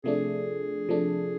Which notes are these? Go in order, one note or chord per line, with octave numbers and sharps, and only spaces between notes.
C3 F3 A3 D4 G#4
C3 F3 A3 D4